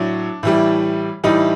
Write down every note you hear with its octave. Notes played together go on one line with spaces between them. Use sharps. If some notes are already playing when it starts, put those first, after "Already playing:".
Already playing: A2 F#3 D4
A2 E3 G3
A2 E3 G3 D#4